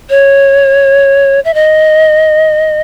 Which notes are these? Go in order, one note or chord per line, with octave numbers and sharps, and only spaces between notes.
C#5
E5
D#5